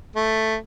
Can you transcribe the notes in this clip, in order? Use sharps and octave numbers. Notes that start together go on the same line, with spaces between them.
A3